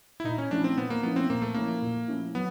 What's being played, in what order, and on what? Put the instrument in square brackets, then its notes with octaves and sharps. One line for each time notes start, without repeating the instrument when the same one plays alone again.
[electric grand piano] E4
[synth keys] A#2 [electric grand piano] D#4
[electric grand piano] C#4
[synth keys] F3 A3 C#4 E4 [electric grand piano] D4
[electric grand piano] C4
[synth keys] A#2 [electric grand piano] B3
[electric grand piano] A#3
[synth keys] F3 A3 C#4 E4 [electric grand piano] B3
[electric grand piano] C4
[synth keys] A#2 [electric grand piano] A#3
[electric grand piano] A3
[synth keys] F3 A3 C#4 E4 [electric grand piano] A#3
[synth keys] A#2
F3 A3 C#4 E4
[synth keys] F#3 [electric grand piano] B3